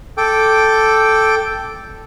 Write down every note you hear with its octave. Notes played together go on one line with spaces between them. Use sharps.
A4 G5 D6